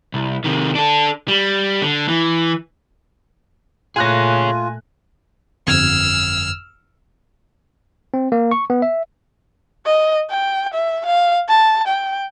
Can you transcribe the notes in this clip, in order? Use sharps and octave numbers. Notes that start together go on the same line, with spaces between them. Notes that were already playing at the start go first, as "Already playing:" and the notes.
C2
C3 D#3
D4 A4
G3
D3
E3
A#2 A3 F4 G#4 C#5 G#5 F#6 A#6
G1 F2 E6 F6 G#6
C4
A#3
C#6
B3
E5
D#5
G5
E5
F5
A5
G5